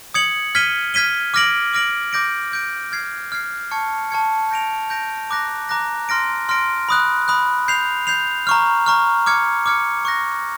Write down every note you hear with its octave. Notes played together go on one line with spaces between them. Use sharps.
D#6 G#6 C#7 F#7
F6 G#6 B6 D#7 G7
F6 G#6 B6 D#7 G7
D6 F6 A#6 D7 F#7
D6 F6 A#6 D7 F#7
D6 G6 A#6 D7
D6 G6 A#6 D7
F6 G#6 C7
F6 G#6 C7
A5 C#6 F6 G#6 C#7
A5 C#6 F6 G#6 C#7
G6 A#6 D7 F7
G6 A#6 D7 F7
A#5 D6 F#6 A#6
A#5 D6 F#6 A#6
C6 F6 A#6 D7
C6 F6 A#6 D7
B5 D#6 F#6
B5 D#6 F#6
G6 C7 F7
G6 C7 F7
A#5 C#6 F6
A#5 C#6 F6
D6 F6 G#6 C#7
D6 F6 G#6 C#7
C#6 F#6 A#6